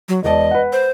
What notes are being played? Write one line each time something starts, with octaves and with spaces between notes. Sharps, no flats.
F#3
E1 D5 D#5 A5
B4 F#5
C5